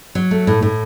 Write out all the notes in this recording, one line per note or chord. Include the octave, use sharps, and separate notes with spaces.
F#3
A3
A2
A2